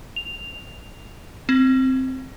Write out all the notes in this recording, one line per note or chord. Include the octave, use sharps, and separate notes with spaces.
F7
C4